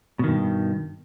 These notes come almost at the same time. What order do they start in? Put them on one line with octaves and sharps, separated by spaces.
B2 D#3 G2